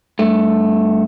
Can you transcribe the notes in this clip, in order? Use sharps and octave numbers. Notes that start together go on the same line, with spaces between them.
G2 A3